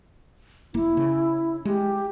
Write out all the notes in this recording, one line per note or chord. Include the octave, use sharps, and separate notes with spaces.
F1 A#3 E4
C#3
G#3 G4